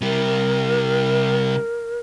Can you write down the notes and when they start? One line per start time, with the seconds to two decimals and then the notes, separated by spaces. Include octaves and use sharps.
0.01 C3 G3 A#4